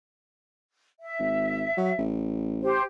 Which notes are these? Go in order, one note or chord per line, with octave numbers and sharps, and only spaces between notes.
E5
G#1
F#3
A1
G4 C5